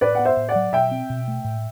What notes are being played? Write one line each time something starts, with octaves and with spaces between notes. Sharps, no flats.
A2 B4 D5
B3 F#5
C5 E5
A2
D5 F#5
F#3
B2 E5 G5
C4
B2
A3
A2